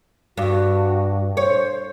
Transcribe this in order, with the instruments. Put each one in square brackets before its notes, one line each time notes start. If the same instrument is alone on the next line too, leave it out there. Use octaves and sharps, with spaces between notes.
[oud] G2 [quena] F#4
[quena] C5 [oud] C#5